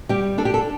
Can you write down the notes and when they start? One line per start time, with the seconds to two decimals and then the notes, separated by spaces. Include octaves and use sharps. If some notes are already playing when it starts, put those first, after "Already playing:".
0.09 G3 G4
0.38 D4 A4
0.45 G4
0.54 A4